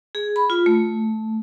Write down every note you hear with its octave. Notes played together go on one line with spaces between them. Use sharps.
G#4
B5
F4
A3